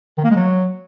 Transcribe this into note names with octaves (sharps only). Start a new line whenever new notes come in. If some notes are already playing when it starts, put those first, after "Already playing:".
D#3
A#3
G#3
F#3